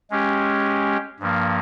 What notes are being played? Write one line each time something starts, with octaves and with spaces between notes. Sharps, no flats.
G#3 C#4 G4
G2 F3 A#3